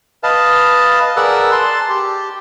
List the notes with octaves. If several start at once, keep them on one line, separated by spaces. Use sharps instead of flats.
B4 D#5 F5 A5
G#4 A#4 B4 D5 F#5 E6
A5 C6
G4